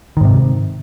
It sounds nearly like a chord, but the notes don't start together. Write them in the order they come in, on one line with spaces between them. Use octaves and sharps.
D#3 G#2 C3